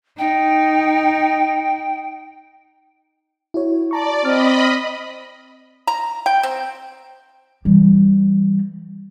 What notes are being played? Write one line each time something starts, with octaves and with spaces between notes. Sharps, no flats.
D#4 G5
E4 F#4 C#5
D5 A5 A#5 C#6
C4 D#5 B5 F6
A#5
G5
C4
E3 G3